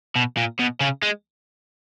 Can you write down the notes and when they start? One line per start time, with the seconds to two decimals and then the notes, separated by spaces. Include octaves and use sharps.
0.16 B2
0.37 A#2
0.60 B2
0.81 C#3
1.02 G#3